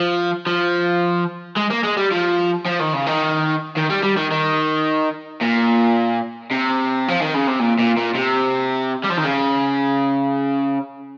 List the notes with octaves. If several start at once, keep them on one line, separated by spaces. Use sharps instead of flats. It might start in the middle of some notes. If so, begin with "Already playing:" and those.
Already playing: F3
F3
G#3
A#3
G#3
G3
F3
F3
D#3
C#3
D#3
D#3
G3
G3
D#3
D#3
A#2
C3
F3
D#3
C#3
C3
A#2
A#2
A#2
C3
G3
F3
D#3
C#3